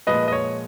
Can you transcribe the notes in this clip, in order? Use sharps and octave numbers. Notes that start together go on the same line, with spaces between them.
A#2 F3 G#3 B4 D#5
D#5
C#5